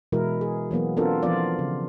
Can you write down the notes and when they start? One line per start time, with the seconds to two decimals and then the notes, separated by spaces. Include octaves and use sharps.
0.12 B2 E3 G#3 E4 A#4
0.41 G#4
0.71 E3 F#3 A#3 B3
0.97 B3 C4 D4 F4 A4 A#4
1.23 E3 F3 B3 F4 D5
1.59 C#3